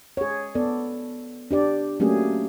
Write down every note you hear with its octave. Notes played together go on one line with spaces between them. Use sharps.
G#4 C#5
B3 A4 D5
D4 G4 D5
F#3 A3 A#3 C#4 G4 G#4